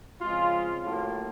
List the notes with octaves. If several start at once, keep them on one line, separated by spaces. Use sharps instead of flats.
C#3 F3 G#3 C4 F4
A2 F#3 A#3 F4